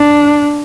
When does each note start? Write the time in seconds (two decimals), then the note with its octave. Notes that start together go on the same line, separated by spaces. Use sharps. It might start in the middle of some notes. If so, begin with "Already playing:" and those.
Already playing: D4